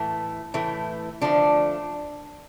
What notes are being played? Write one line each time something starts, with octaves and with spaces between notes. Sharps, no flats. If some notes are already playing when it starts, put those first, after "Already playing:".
Already playing: A2 E3 A3
A2 E3 A3
D3 F3 A3 D4